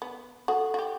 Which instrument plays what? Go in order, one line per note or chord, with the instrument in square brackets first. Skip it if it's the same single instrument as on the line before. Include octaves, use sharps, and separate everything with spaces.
[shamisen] B3
[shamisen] F#4 [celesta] A4 F#5 D#6
[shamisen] F#4 G4